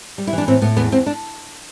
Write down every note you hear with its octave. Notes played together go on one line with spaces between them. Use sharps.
G3
E4
E3 D4
A2 C4
A2 B3
E2 B3
E2 C4
D4